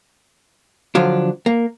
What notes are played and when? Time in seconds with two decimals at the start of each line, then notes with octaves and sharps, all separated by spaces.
0.95 D3 F3 F#3 D4
1.46 A#3